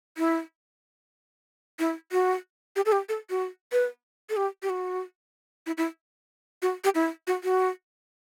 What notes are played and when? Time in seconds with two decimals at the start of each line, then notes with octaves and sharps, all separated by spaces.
0.18 E4
1.79 E4
2.12 F#4
2.76 G4
2.86 A4
2.92 G4
3.09 A4
3.30 F#4
3.72 B4
4.30 A4
4.37 G4
4.63 G4
4.70 F#4
5.66 E4
5.77 E4
6.62 F#4
6.84 G4
6.95 E4
7.27 F#4
7.44 F#4